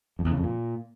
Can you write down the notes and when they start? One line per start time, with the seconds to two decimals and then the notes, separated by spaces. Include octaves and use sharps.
0.19 F2
0.25 E2
0.31 C#3
0.37 F2
0.43 A#2